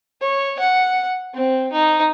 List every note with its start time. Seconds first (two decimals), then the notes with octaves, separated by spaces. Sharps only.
0.21 C#5
0.59 F#5
1.34 C4
1.72 D#4